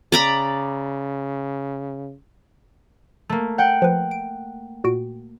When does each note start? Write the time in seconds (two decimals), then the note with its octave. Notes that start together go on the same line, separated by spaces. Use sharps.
0.12 C#3 D5 A#5 B5
3.29 A3 A#3
3.58 F#5 G5
3.82 F3 B4
4.11 D7
4.84 A#2 F#4 D7